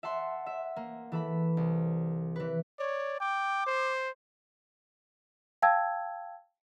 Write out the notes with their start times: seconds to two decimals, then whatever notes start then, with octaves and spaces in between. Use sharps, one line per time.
0.03 E5 F#5 A5 C6
0.46 E5
0.76 A#3
1.12 E3 A4 B5
1.57 C2
2.36 E3 B4
2.79 C#5 D5
3.20 G5 D6
3.66 C5
5.62 F5 G5 A5 E6 G#6